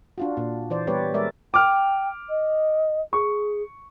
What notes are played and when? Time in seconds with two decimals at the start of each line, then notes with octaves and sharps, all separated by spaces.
0.18 D4 F4 F#4
0.37 A#2 D4
0.70 E3 C5 D5
0.87 G3 B3 G4 B4 C#5 D5
1.14 G#3 A#4 D5 E5
1.54 G5 D6 F6
2.29 D#5
3.13 G#4 C#6